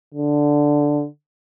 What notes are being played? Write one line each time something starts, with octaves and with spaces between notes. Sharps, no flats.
D3